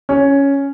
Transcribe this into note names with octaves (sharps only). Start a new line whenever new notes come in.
C#4